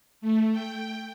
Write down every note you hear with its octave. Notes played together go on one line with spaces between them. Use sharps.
A3
G5